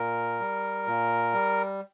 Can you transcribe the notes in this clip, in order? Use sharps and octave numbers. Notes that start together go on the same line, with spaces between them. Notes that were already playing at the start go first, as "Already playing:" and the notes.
Already playing: A#2 A#4
G3
A#2
G3